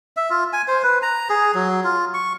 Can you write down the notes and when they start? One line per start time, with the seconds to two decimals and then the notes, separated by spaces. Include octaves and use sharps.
0.17 E5
0.30 F4
0.53 G#5
0.68 C5
0.83 B4
1.02 A#5
1.30 G#4
1.55 F#3
1.84 F4
2.14 C#6